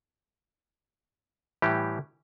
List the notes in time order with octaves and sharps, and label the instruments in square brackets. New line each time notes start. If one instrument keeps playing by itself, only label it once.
[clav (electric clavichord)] A2 E3 G3 G4